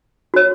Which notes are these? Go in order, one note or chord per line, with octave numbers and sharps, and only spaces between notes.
F#4 C#5